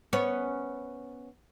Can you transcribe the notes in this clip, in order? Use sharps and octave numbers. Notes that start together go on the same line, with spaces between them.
B3 C#4